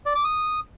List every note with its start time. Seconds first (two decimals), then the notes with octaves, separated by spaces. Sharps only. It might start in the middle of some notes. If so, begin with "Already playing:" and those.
0.06 D5
0.15 D6
0.24 D#6